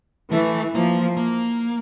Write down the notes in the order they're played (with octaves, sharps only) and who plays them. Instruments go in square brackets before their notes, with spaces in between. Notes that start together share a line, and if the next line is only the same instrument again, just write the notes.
[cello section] E3 [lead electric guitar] A3
[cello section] F3 [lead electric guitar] A#3
[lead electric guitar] A#3